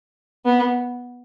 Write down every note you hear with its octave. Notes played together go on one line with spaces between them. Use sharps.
B3